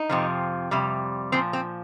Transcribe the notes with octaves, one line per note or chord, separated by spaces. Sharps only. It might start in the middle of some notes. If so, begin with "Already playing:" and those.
Already playing: D#4
F2 C3 F3
F2 C3 G3
A#2 F3 C4
C4